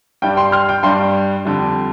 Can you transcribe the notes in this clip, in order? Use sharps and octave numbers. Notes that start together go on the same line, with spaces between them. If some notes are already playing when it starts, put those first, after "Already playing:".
G2 G3 D4 G5
G5 C6
C6 F6
G5
G2 G3 D4 G5 C6
F2 D3 G3